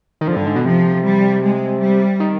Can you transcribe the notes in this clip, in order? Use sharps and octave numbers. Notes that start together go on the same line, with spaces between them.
D#3
D3 F3
G2
G#2
B2
C3 F3
G3
G#3
G3
D#3